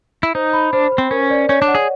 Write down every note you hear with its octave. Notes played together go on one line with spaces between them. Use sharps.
E4
D#4 C5
B5
D4 C5
C5
C4
C#4 A#4
D5
C#4 C#5
D4
F#5
G#4